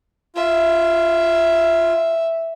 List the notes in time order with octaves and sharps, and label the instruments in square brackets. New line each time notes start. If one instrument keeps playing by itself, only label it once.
[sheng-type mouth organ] F4 [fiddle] E5